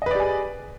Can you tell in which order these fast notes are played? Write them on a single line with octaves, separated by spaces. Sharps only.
D#5 B4 D5 G4 G#4